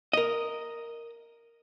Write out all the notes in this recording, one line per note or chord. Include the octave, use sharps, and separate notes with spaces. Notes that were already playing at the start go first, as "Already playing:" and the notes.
A#4 D#5